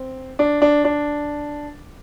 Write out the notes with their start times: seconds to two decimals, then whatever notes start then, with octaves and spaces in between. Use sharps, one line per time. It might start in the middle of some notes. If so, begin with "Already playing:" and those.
Already playing: C4
0.39 D4
0.62 D4
0.85 D4